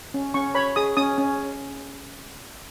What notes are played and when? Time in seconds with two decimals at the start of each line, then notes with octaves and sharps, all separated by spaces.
0.14 C#4
0.34 C#4 C#6
0.55 C#5 B5
0.76 G#4 D#6
0.97 C#4 D#6
1.18 C#4